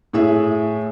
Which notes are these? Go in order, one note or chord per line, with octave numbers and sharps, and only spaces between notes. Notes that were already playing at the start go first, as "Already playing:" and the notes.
A2 G#4 E5